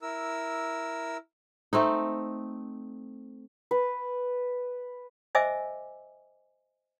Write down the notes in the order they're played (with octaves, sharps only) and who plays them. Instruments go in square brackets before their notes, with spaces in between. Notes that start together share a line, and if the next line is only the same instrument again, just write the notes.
[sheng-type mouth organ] E4 A#4 E6
[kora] A3 C4 D#4
[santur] B4
[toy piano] C5 D#5 E5 G#5 D6 E6